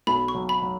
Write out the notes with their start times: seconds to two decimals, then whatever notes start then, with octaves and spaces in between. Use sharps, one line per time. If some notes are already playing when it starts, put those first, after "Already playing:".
0.07 B1 B5
0.28 C#6
0.35 F#3
0.49 B5
0.62 F#3